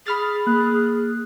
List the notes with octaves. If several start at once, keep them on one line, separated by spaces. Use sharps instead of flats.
G#4 B5 F6 A6
A#3 F#6